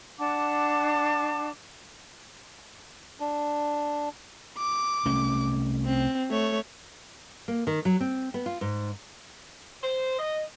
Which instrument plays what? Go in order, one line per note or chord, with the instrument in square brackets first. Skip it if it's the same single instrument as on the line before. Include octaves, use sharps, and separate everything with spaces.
[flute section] D4 F#5 A5 D6
[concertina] D4
[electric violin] D6
[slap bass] C2 A3 C#4
[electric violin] C4
A3 C#5
[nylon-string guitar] A#3
D#3
F#3
C4
B3
F4
G#2
[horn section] C5
D#5